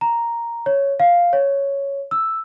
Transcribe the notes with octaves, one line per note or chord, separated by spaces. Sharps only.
A#5
C#5
F5
C#5
E6